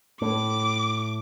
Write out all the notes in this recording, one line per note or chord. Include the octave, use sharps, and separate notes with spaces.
A2 D6